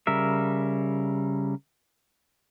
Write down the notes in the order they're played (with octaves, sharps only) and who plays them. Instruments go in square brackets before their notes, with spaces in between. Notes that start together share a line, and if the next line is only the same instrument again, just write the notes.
[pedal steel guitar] C#3 G3 A#4 E5